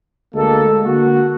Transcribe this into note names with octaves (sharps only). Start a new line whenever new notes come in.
D2 G#3 A#3 A4
D3 A#3 F#4